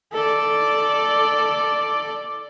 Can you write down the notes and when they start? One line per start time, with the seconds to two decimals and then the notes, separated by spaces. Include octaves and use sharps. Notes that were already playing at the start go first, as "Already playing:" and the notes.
0.13 A4 D5